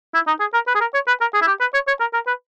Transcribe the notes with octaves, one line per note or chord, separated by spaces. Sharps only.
E4
D#4
G#4
A#4
B4
G#4
A#4
C#5
B4
A#4
G#4
E4
G4
B4
C#5
C#5
A#4
A#4
B4